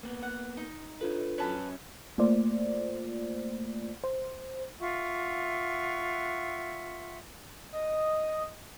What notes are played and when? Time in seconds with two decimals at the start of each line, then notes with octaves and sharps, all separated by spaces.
0.03 A#3 B3
0.23 F#5
0.57 D#4
1.01 D4 F4 A4 B4 C#5
1.38 F#3 C#4 B4 C#5 A5 B5
2.18 A3 A#3 F4 C5 D5
4.04 C5
4.80 F4 E5 F#5 C#6
7.73 D#5